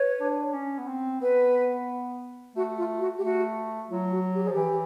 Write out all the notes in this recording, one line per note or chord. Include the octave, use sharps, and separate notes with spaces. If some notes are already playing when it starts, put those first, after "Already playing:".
Already playing: B4 C#5
D4
C#4
B3
C4
B3 B4
A3 F#4
F4
F#4
G4
A3 F#4
F#3 F4
F#4
G4
F3 G#4
E3 G4